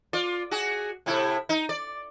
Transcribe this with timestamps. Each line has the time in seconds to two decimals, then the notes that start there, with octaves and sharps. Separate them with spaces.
0.13 F4 D5
0.51 F#4 G#4
1.06 A2 C3 E4
1.49 D#4
1.69 D5